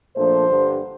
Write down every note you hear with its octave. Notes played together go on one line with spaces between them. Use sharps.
A#2 F3 A3 D4 C5
G2 D3 G3